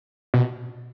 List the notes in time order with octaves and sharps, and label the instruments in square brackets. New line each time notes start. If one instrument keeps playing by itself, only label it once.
[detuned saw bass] B2